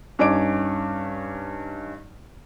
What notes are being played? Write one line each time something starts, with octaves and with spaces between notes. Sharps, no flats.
G2 C#4 D#4 D6 D7